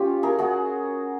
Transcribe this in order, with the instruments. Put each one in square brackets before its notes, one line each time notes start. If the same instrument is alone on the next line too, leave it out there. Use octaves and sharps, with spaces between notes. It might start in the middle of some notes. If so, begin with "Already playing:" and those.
Already playing: [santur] C#4 F4 G4
G#4 A#4
F#4 G#4